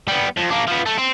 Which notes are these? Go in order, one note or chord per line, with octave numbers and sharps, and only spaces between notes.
G3 B3
F2
A#3 D4
F3 B3
A3
C4